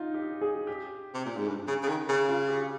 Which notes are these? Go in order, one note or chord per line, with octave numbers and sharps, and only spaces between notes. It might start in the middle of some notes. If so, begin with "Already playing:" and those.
Already playing: D#4 F4
G4
G#4
G4
C3
A#2
G#2
G2
C#3
C#3
D#3
C#3
F4
G4